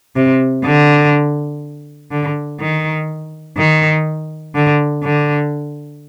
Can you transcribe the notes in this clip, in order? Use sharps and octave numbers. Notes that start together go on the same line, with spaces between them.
C3
D3
D3
D#3
D#3
D3
D3